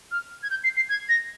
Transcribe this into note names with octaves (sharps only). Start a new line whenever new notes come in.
F6
G#6
G6
C7
C7
G#6
A#6